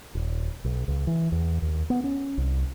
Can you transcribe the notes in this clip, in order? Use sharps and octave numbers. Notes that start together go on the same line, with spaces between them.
D#1
B1
C#2
E3
E2
D#2
B3
C#4
C2